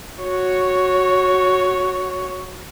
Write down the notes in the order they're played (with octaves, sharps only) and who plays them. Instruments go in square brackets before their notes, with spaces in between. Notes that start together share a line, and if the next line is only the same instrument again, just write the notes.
[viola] F#4 C#5